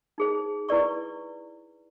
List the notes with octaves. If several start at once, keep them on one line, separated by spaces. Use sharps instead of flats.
D#4 G#4 C5
E4 B4 D5 C#6